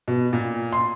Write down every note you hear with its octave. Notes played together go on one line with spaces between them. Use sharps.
B2
A#2
C6